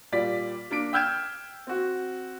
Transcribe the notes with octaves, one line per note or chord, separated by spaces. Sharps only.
A#2 G3 D5 B6
A#3 D4 A#4 B6 D7
G5 E6 F6 G6 G#6 E7
C4 F#4